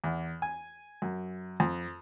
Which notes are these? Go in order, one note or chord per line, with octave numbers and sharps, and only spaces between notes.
E2
G#5
F#2
F2